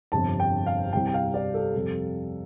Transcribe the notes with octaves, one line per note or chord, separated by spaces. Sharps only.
G1 F2 C3 A5
G5
F5
C2 C3 G3 G5
G5
F5
D5
A4
F2 C3 G3